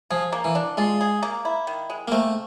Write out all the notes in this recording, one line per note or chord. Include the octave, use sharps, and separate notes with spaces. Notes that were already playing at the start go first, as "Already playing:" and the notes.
F3 G#4
A#3
E3
D4
G#3 F4
G#4
A#3
E4
D#3
G#3
A#3
A3 C4